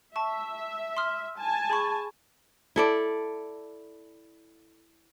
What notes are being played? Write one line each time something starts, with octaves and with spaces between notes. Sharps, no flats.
E5 A5 C#6
C6 D#6 F6
G#5 A5
G#4 B5 C#6
E4 A4 D5